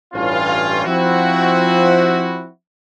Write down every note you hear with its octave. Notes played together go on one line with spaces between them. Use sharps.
A1 G2 C#4 F4
F3 C4 E4 F#4